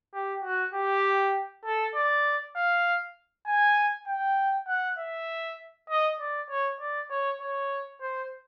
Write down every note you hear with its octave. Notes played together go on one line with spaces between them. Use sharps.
G4
F#4
G4
A4
D5
F5
G#5
G5
F#5
E5
D#5
D5
C#5
D5
C#5
C#5
C5